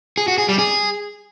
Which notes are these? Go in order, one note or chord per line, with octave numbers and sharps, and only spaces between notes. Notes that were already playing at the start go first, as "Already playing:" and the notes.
G#4
F#4
G#4
G3
G#4